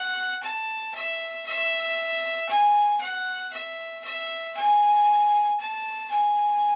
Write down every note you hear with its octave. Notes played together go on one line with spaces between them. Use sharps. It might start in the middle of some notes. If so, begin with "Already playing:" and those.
Already playing: F#5
A5
E5
E5
G#5
F#5
E5
E5
G#5
A5
G#5